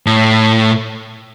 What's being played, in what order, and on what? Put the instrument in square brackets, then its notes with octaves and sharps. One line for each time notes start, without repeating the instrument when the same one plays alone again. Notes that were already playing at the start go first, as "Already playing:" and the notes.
[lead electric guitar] A2